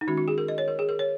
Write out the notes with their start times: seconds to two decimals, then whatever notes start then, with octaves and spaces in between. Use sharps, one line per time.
0.01 D#4
0.07 D#3 G#3 C#4 F#4
0.17 F#4
0.28 G#4
0.38 A#4
0.48 D#5
0.58 C#5
0.68 A#4
0.79 G#4
0.89 A#4
0.99 C#5